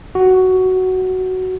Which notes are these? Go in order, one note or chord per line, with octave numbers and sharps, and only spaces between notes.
F#4